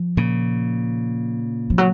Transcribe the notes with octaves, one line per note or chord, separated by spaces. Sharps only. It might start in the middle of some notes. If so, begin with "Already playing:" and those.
Already playing: F3
A#2 C#3
F3
F#3